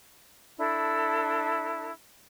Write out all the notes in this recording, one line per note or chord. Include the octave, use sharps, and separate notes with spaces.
D4 E4 A4